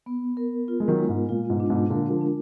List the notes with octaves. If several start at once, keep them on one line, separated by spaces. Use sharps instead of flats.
B3
A#4
F4
G#3
D#3 F#3
G#3
G#2
A#2 F4
G#2 B2
D4
G#2 B2
A#2 D3 A#4
D3 F3
D4